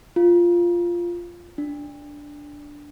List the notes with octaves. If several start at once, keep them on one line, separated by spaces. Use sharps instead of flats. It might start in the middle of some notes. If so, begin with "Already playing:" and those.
F4
D4